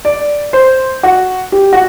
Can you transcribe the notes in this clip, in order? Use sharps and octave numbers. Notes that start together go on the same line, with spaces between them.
D5
C5
F#4
G4
F#4